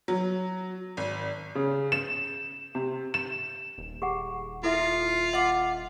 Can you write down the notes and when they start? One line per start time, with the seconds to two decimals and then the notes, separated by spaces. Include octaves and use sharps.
0.08 F#3
0.97 G#1
1.55 C#3
1.92 E7
2.75 C3
3.14 E7
3.78 D#1
4.02 G4 G#4 F#5
4.63 E4 F4 A4 E5
5.33 D#5 F5 F#5 D6